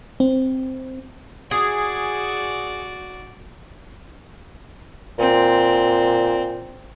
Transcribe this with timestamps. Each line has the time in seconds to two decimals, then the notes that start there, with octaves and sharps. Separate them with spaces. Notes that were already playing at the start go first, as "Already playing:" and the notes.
0.20 C4
1.51 F#4 G#4 D5
5.19 A#2 C4